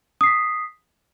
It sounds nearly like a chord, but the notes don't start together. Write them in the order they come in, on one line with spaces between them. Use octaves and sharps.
D#6 C7 B6